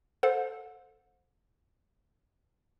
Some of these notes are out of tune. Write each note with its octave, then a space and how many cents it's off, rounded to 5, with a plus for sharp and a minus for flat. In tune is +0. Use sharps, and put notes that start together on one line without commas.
A4 +0 C5 +0 F#5 -35